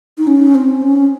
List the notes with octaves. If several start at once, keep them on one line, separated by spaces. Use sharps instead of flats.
D#4
C#4
C4
C#4